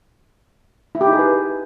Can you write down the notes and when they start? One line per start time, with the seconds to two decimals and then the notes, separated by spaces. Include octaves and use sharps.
0.95 E4
1.01 G4
1.07 D#4
1.13 G#4
1.19 B4